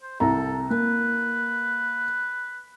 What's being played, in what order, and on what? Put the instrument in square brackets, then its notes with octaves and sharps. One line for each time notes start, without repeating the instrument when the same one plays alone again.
[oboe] C5
[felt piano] C2 A#5 [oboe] A4
[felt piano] A#3 [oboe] B4